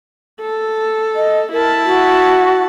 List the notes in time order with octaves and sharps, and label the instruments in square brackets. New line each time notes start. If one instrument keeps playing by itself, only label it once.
[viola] A4
[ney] D#5
[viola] E4 A5 [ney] A#4
[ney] F#4